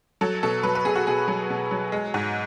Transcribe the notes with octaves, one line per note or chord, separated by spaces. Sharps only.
F#3 A4
B2 A4
F#3 B4
B4
B2 G#4
F#4
B2 G#4
F#3
B2
F#3
G#3
G#2